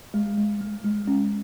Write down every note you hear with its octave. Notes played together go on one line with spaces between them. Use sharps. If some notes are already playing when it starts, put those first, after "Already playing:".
G#3
G#3
G#3
G#3
C#4